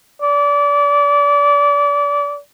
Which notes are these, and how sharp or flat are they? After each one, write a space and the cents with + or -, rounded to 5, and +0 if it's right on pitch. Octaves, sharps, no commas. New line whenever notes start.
D5 -30